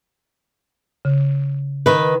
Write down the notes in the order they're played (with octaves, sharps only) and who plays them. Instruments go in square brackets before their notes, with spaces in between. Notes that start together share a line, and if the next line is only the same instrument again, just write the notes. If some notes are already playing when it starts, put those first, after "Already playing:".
[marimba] C#3
[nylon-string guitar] D#3 B4